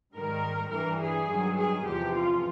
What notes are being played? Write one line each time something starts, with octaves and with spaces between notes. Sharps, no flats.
G#2 D#3 G3 A#4
G2 E3 G3 A#4
G#4
G2 D#3 F#3
G#4
E2 C3 F3 G4
F4